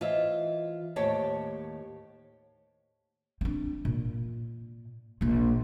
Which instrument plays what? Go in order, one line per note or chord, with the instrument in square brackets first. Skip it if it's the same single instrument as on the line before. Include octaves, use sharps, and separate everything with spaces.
[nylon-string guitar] E3 F4 C5 D#5 E5
D#2 A2 G4 C5 C#5 A5
[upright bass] C4 D4
A#2
A#1 F4